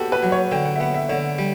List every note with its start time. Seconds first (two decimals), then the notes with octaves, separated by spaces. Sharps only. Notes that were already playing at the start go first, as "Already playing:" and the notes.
Already playing: B3 F#4 G4 A4
0.12 B4
0.23 F#3
0.32 C#5
0.51 D3 G5
0.65 F#5
0.76 E5
0.80 B3 F#5
0.94 E5
1.09 D3 C#5
1.38 G3